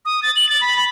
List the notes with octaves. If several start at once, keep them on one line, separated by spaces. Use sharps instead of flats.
D#6
A6
F#7
A6
B5
B5